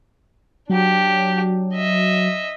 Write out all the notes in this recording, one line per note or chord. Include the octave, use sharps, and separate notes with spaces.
F#3 D4 G4
D#5 E5